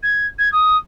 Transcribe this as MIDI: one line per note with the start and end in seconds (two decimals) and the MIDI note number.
0.03 0.26 92
0.38 0.52 92
0.52 0.76 87